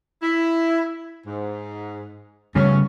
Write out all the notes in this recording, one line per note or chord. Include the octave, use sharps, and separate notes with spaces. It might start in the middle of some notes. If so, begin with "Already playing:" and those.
E4
G#2
E2 C#3 F#3 G3 A3 C#4